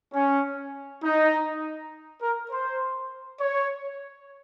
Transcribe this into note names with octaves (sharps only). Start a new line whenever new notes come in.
C#4
D#4
A#4
C5
C#5